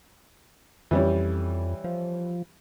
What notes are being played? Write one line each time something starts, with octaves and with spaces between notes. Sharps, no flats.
F2 E3 G3 C#4
F3